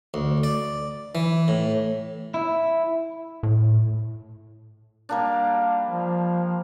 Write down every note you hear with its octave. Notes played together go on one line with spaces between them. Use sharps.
D2
D5
E3
A2
E4
A2
G3 A#3 D4
F3